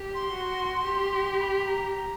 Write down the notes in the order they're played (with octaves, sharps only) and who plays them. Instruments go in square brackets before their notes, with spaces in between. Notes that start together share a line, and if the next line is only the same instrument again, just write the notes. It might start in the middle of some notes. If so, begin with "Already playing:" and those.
Already playing: [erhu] G4
[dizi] C6
[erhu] F#4
G4
[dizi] B5
A#5